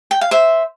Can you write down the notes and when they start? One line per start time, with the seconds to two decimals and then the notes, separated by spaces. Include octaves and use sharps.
0.11 G5
0.21 F5
0.31 C5 E5